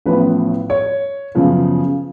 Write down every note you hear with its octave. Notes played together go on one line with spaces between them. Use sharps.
A1 A2 F3 B3 B4
C#5
F#2 C#3 F3 B3